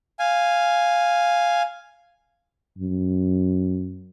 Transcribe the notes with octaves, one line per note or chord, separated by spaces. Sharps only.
F5 G#5
F#2